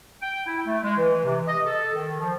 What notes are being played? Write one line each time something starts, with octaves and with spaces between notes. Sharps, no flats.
G5
E4
A3
G#3
E3
C3
D#5
A4
D#3
F3